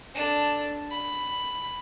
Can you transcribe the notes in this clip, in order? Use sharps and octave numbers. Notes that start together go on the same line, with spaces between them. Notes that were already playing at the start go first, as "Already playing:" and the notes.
D4 A4
B5